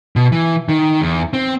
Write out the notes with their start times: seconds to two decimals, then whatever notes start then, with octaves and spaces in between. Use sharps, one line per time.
0.16 B2
0.32 E3
0.69 D#3
1.01 E2
1.33 C4